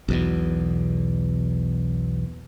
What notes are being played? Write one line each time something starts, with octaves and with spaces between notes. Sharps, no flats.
B1 E2 B2